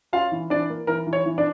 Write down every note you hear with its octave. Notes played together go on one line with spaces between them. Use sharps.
C#4 F4 F5
E3
E3 D4 D5
A#3
E3 A#4
E3
C#5
E3
D4 D5